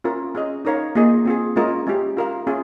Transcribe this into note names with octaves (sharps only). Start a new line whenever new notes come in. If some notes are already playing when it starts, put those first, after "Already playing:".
C#4 F4 A#4
C#4 G#4 D#5
D#4 A#4 C#5 F5
A#3 F4 G#4 D#5
C4 F4 G#4
G#3 C#4 F4 A#4 D#5
G#3 C#4 G4
F4 A#4 F5
C#4 F4 G#4